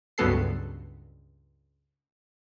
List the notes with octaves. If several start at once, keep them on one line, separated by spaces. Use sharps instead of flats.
C#2 G2 F#3 B3 A4 C7